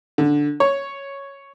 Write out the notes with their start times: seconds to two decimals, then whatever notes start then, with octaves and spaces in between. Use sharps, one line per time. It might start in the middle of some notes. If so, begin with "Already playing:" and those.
0.18 D3
0.60 C#5